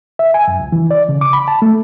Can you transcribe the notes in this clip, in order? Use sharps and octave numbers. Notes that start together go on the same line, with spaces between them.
E5
G#5
F#2
C#2
E3
D5
C#3
D6
B5
A5
A3